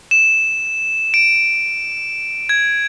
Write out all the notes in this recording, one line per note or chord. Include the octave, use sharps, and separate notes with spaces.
E7
D7
G#6